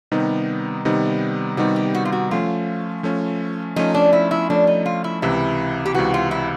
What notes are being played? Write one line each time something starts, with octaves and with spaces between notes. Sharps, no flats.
C3 D#3 G3 B3 D#4
C3 D#3 G3 B3 D#4
C3 D#3 G3 B3 D#4 F#4
G4
F#4
F4
F#4
F3 A3 C#4 F4
F3 A3 C#4
F3 A3 C#4 D#4
D4
E4
E4
F3 A3 C#4 D4
D#4
F4
E4
C#2 C3 E3 E4
G4
C#2 C3 E3 F#4
F4
E4